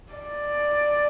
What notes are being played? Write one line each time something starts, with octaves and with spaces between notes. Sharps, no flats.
D5